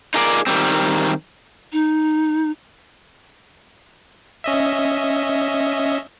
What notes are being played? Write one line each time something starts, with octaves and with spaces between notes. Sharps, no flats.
D#4 F4 G#4 A#4 B4 D5
D#3 G3 C4
D#4
C#4 D#5 E5